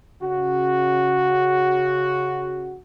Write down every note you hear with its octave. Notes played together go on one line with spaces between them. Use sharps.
C#3 F#4